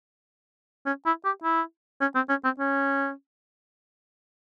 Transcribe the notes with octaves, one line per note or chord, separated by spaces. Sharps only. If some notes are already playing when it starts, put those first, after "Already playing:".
C#4
E4
G4
E4
C#4
C4
C#4
C4
C#4